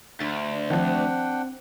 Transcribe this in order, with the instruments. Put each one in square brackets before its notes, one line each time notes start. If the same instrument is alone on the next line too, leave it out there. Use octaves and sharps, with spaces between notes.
[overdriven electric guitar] D2 [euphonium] D4 [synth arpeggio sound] A6
[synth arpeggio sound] D#3 F3 [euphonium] C4 [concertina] D4 F#5 G5